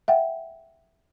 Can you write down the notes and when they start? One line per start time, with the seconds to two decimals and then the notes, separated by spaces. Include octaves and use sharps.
0.08 E5 F#5 G5